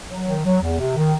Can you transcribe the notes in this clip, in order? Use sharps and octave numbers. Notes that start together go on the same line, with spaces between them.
F#3
D#3
F#3
E2
C3
D#3